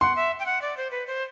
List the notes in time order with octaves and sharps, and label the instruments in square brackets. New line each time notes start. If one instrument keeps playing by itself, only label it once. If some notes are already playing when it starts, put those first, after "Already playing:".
[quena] F#5 [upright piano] C6
[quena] E5
G5
F#5
D5
C5
B4
C5